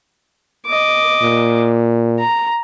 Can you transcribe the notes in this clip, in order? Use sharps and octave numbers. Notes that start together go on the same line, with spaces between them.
D#5 D6
A#2
A#5